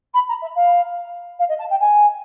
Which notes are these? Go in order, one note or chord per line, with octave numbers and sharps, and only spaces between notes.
B5
A#5
E5
F5
F5
D#5
A5
G5
G#5